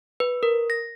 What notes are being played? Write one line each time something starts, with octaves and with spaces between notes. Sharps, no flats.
B4
A#4
A#6